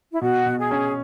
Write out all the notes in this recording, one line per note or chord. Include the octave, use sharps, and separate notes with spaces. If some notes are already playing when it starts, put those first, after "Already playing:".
E4
B2 F#4
B2
G#4
C#4